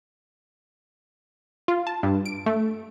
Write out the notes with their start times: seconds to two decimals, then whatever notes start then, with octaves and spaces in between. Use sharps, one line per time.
1.68 F4
1.87 A5
2.03 G2
2.25 D7
2.46 A3